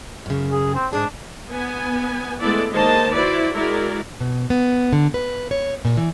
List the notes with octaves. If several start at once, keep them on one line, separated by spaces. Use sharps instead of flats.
F#2 C#3
G#4
C4
G#2 D4 G#4
B3 G#5
G#3 A3 B3 E4 A4 D5
D#3 G#3 A#3 C5 D#5 A5
E4 F#4 B4 C5 D5
G#3 E4 F#4 G#4 A#4 D5
B2
B3
D3
B4
C#5
A#2
E3